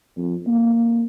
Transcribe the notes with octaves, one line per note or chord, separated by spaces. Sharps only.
F2
A#3